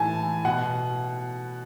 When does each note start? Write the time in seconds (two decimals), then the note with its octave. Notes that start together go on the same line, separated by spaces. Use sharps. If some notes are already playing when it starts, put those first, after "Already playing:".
Already playing: A2 E3 G#5 A5
0.45 B2 F#5